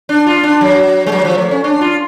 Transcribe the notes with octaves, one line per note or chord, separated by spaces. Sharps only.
D4
F4
D4
F#3
G#3
F#3
F3
A3
C#4
D4
F4